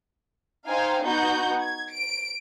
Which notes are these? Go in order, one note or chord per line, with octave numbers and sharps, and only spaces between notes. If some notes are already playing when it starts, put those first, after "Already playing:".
D#4 C5 F5 G5 G#5
B3 D#4 F#4 F#5 G6
G#6
D7